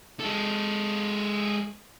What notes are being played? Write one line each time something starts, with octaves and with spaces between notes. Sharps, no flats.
G#3 A4